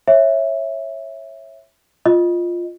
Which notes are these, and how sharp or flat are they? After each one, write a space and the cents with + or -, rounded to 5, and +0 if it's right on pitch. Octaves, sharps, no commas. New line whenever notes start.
C#5 -20 E5 +0
F4 +0 D#5 -5